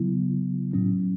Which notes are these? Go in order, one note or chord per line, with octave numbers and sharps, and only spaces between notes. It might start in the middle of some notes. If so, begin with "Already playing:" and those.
Already playing: C#3 F#3 B3 E4
A2 F#3 C#4